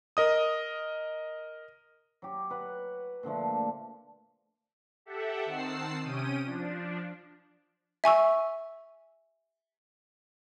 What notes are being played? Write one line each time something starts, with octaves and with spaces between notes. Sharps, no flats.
A#4 D#5 D#6
F#3 G4
B4 F#5
A#2 D3 F3 A3
G4 A4 E5 F#5
D#3 C4 F#5 A5 E6 C7
C3 C#4 G5 D#6 D#7
F3 D4
E5 G#5 C#6 E6